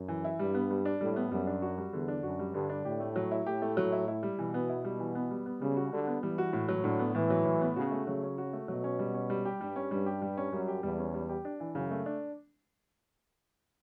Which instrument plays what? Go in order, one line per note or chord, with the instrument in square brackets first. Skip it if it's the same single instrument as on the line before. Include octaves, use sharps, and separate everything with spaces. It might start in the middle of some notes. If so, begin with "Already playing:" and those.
Already playing: [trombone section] F#2
[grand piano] E3
E4
[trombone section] G2 [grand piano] G3
[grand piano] B3
G3
D4
[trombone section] A2 [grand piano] G3
[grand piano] B3
[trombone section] F#2 [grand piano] G3
[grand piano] D4
F#4
G3
[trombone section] E2 [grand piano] D3
[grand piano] D4
[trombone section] F#2 [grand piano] F#4
[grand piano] G3
[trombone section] G2 [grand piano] D3
[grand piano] D4
[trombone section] A2 [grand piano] G4
[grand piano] A3
F#3
E4
[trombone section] A2 [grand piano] G4
[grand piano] A3
F#3
E4
E4
G3
[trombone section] B2 [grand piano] E3
[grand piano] B3
E4
G3
E3
B3
G3
B3
[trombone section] C#3 [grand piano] G3
[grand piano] F#4
[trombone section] D3 [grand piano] G3
[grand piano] B3
[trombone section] E3 [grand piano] G3
[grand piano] F#4
A2
F#3
[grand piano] A2 [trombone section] D3
[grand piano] B3
[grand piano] A2 [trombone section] E3
[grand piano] F#3
A2
B3
[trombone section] C#3 [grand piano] F#4
[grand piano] A3
[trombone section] C#3 [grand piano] F#3
[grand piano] C#4
F#4
A3
[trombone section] B2 [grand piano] F#3
[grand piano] C#4
G3
C#4
G3
G4
[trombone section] G2 [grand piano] G3
[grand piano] C#4
[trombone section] G2 [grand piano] G3
[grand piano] G4
G3
C#4
[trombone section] F#2 [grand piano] G3
[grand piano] G4
[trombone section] E2 [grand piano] G3
[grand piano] C#4
G3
G4
D4
E3
[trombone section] F#2 [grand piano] C#3
[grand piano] A3
D4